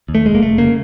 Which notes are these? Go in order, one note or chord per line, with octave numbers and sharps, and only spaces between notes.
D#2
A3
F1 G#3
A#3
F1 A3
C#3 A#3